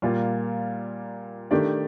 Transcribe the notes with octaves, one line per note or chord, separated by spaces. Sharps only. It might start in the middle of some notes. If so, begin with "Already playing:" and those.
A#2 G3 A#3 F4
D#3 A3 D4 G4 D5